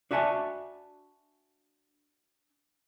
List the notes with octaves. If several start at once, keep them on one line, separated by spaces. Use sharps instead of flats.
D4 F#4 E5 G#5 A5